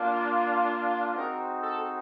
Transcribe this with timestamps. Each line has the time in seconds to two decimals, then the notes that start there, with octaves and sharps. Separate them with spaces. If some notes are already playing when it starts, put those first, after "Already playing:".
Already playing: A#3 D4 F4
1.15 G#3 C4 D#4 F#4 A#4
1.62 A4